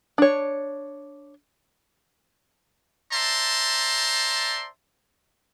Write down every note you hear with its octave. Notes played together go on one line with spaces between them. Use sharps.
D4 C#5
C5 D5 E5 A5 A#5 C6